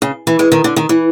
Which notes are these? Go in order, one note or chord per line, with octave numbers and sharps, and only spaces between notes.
C#3
E3
G#3
D#3
D3
D#3
E3